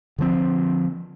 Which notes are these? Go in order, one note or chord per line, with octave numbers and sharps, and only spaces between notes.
D3 F3 C4